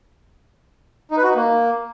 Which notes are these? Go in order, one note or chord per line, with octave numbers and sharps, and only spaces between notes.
D#4
B4
F#4
D#4
A#3